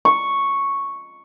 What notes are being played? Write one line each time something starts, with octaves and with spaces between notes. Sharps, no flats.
C#6